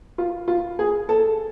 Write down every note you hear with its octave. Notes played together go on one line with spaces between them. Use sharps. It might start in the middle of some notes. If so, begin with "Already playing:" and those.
F4
F4
G#4
A4